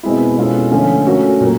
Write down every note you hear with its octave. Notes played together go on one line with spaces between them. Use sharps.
B2 G#3 C4 E4
B2 G#3 C#4 F4 A4
D3 F3 A3 C#4 F4
A3 C#4 F#4 A#4
A#2 F#3 A#3